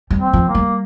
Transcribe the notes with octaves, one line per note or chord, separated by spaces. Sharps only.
G3
C4
F3
A#3
G3